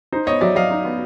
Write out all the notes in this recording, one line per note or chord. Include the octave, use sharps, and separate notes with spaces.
D#4 C5
B3 C#5 D#5
F#3 D5 E5
F#3 D#5 F5
D#4
B3